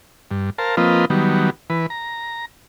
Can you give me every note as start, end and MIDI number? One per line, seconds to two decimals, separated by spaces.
0.31 0.50 43
0.58 0.76 70
0.58 0.76 72
0.58 0.76 77
0.58 0.76 81
0.77 1.05 53
0.77 1.05 58
0.77 1.05 60
0.77 1.05 65
0.77 1.05 71
0.77 1.05 75
1.10 1.50 51
1.10 1.50 54
1.10 1.50 55
1.10 1.50 59
1.70 1.86 52
1.70 1.86 71
1.90 2.45 82